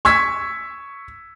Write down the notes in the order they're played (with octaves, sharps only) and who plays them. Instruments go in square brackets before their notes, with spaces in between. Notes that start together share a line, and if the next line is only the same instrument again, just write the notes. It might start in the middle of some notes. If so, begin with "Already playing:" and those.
[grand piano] C#6 E6 G#6 B6